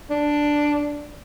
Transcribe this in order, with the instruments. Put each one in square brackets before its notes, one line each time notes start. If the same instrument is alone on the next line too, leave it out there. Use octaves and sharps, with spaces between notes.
[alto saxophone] D4